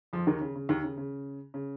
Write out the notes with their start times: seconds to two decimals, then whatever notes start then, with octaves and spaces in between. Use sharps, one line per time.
0.13 F2 F3
0.27 D#2 D#3
0.41 C#3
0.56 C#3
0.69 D#2 D#3
0.84 C#3
0.98 C#3
1.54 C#3